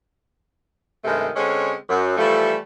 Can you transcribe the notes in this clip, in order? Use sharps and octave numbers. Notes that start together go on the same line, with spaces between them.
G2 C3 D#3 G#3 A3
D3 G#3 C4 C#4
F#2
E3 F3 G3 A3